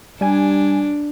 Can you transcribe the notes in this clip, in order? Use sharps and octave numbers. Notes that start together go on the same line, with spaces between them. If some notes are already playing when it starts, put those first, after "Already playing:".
G3 D4 G#5